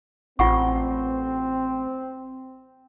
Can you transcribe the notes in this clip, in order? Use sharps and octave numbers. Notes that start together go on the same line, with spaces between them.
A1 C4 F4 F#5 C#6